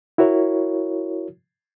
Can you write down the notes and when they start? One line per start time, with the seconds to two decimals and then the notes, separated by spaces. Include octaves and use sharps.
0.18 E4 F#4 A#4 C#5